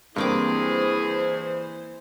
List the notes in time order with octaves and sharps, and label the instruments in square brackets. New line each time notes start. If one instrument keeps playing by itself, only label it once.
[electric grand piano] G2 [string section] E3 C5 [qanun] A#3 C4 D6 [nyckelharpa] G#4